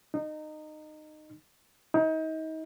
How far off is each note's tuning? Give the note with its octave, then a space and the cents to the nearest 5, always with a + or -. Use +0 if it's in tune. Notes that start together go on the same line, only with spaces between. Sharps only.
D#4 -20
D#4 +35